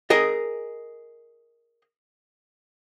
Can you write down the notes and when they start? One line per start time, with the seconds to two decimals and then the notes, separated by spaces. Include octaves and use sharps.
0.10 G#4 A#4 D#5